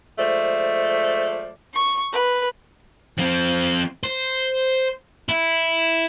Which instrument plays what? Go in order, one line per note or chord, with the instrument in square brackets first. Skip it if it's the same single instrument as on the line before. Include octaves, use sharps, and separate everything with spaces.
[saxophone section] F3 G#3 A3 C5 D5
[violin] C#6
B4
[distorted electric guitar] F3 C4
C5
E4